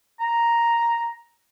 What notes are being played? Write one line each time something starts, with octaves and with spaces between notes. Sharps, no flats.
A#5